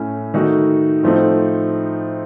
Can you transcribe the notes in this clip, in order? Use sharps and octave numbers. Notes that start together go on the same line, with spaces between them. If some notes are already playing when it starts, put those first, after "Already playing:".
Already playing: A2 A3 C#4
D#3 A3 D#4 F#4
A2 F3 A3 C4 D#4